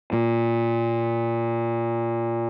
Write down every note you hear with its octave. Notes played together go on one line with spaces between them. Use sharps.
A#2